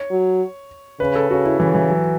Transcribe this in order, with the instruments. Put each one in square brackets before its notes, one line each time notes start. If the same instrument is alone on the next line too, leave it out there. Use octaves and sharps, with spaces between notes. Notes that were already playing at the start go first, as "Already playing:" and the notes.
Already playing: [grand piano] C#5
[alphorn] F#3
[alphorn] C#3 [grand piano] B4
[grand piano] A4
[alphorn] C#3 [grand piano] F#4
[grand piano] E4
[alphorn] C#3 [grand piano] E3
[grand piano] E3
F#3